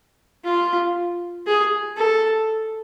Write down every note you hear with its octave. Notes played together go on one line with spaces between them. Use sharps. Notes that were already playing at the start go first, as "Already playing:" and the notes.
F4
G#4
A4